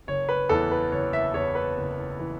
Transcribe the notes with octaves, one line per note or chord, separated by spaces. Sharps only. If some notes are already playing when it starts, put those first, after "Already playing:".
F#1 C#5
B4
E2 E3 A4
B4
F#1 C#5
E5
E2 E3 C#5
B4
F#1
E3